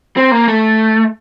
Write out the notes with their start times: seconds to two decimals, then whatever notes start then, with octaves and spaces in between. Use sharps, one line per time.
0.17 C4
0.31 A#3
0.48 A3